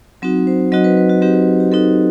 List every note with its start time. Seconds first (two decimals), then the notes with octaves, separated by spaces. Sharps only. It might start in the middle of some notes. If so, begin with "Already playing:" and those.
0.22 F#3 C4 D#4 F#4
0.47 C5
0.72 F#3 C4 D#4 F#4 D#5
0.84 B4
0.97 B4
1.09 F#4
1.22 F#3 C4 D#4 F#4 G4
1.34 G4
1.60 G4
1.72 F#3 C4 D#4 F#4 A4